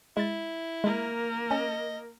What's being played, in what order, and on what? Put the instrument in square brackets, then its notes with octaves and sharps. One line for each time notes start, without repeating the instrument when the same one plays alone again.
[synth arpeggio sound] G#3 A6 [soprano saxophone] E4
[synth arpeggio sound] G#3 [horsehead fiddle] A#3 A#4
[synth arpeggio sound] C#4 [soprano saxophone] D#5